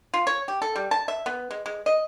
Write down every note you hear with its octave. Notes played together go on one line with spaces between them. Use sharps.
F4
C#5
G4
A4
G3
A5
E5
B3
G#3
G#3
D#5